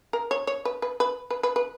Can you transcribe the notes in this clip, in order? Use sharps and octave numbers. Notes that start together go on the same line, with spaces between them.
A#4
C#5
C#5
B4
B4
B4
B4
B4
B4